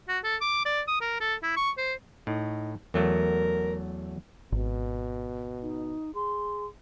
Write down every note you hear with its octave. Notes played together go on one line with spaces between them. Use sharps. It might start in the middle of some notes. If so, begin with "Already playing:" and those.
F#4
A4
D6
D5
D#6
A#4
A4
E4
C#6
C5
A2 D#4
E2 F#3 A3 A#4
G#1 B2
D#4
G#4 C6